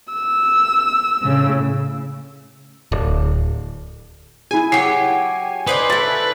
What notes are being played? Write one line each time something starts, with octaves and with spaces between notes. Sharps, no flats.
E6
A2 C#3
D1
E4 G#4 G#5
F#3 G4 C7
D#4 B4 C5 D5
A3 E4 A6